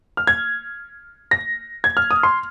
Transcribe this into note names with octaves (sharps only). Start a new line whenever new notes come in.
F6
G#6
A#6
G#6
F6
D#6
C6